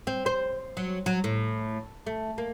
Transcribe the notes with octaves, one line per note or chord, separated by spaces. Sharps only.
C4
C5
F#3
F#3
A2
A3
A#3